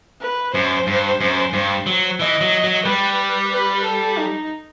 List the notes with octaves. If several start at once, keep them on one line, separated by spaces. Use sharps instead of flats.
B4
F#2 C5
G2
F#2
G2
F#3
E3 D#5
F#3
F#3
G3 B4
B4
A4
D#4